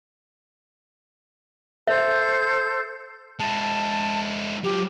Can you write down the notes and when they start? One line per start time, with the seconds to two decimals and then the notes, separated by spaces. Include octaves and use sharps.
1.87 A4 C5 E5 G6
3.40 G#3 E4 A5
4.64 F#3 F4 G4